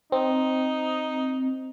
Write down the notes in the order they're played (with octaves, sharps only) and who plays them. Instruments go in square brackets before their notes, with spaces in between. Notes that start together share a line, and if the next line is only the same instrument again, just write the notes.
[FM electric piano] C4 [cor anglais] D#4